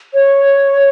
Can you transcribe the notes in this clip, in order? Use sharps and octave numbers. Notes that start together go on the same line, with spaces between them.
C#5